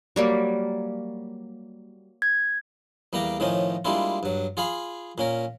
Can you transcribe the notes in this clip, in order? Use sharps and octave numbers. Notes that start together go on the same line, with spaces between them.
F#3 G3 A#3
G#6
E2 G3 A#3 G4 A#5
A2 D#3 F3 C#4 D#4
G3 G#3 A#3 D4 E4 F4
G2 F#3
F4 G#4 F5 B5
A#2 C#4 A#4